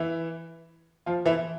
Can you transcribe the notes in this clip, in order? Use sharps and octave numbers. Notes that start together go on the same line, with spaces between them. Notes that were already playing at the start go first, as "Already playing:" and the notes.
Already playing: E3 E4
F3 F4
E3 E4